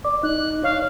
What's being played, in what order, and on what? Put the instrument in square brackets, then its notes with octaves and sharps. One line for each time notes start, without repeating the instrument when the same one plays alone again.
[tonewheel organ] D5
[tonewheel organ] D#4 [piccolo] F#6
[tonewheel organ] C#5 [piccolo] F5